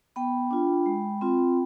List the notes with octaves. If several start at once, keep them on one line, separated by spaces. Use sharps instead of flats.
B3 G5 B5
D4 F4
G#3
C4 F4